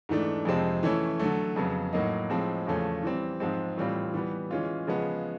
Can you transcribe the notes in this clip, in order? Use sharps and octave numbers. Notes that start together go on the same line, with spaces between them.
G#2 E3 A3 D4
F2 C3 F3 G#3 C4
E3 A3 C#4 E4
D3 F#3 A3
F2 C#3 F#3 B3
A2 F#3 A#3 D#4
A2 F3 G#3 C4
E2 C#3 F3 A3 C#4
E3 G3 C4
G#2 F3 G#3 C4
A2 E3 G3 C4 F4
E3 G3 B3
E3 G#3 C#4 F4
C#3 F3 G#3 B3